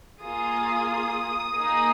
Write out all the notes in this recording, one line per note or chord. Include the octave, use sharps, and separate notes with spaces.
A#3 F4 G#4 D#6
A#3 D#4 G#4